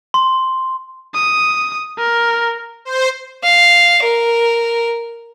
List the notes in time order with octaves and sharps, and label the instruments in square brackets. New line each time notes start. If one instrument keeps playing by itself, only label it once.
[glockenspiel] C6
[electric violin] D#6
A#4
[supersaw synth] C5
[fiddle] F5
A#4